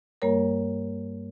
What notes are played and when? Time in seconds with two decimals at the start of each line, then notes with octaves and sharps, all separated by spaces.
0.22 G2 G3 A#3 A#4 C#5